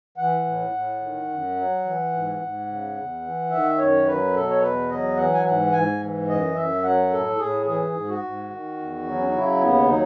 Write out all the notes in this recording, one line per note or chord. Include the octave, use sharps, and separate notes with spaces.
E3 F#5
A2
A2
D#3
F#2
F#3
E3
G#2
G#2
C#3
E2
E3
D#3 E5
F#2 C#5
F#3 B4
B2 A4
C#5
E2 B4
F#3 D#5
E3 F#5
G#5
G#2 F#5
G#2 G#5
E3
F#2 D#5
F#2 E5
F#3 F#5
A2 A4
A2 G#4
E3 G#4
G#2
F#4
G#2
D#3
E2
F#3
B3
C#4
D#4
C#3 E4
D#2 B3
F#3 D#4